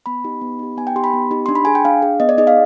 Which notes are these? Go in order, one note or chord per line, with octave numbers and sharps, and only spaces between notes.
B3 B5
D#4 G4
B3
D#4 G4
B3 G#5
G5
D#4 G4 C6
B5
B3
D#4 G4
D4 C6
B5
G#4 G#5
G5
D4 F5
G#4
B3 D#5
D5
D#4 G#4 D#5
F5